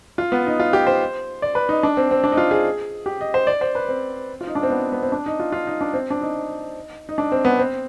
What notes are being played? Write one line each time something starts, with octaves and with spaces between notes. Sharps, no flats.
F4
B3
D#4
F4
G4
C5
D5
B4
D#4
D4
C4
C4
D4
D#4
F4
G#4
G4
D#5
C5
D5
C5
B4
C4
F4
D#4
D4
C4
B3
B3
C4
D4
D#4
F4
F4
D#4
D4
C4
D4
D#4
D#4
D4
C4
B3
C4